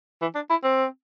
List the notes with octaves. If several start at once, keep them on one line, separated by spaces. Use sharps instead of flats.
E3
D4
E4
C4